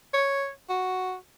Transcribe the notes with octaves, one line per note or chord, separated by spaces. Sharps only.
C#5
F#4